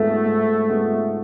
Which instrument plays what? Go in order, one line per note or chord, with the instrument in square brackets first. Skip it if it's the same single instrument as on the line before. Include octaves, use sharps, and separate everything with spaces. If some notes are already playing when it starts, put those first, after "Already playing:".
Already playing: [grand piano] G#2 G#3 B3 F4 A4 [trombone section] A3
[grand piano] G#2
G#3 B3 F4 A4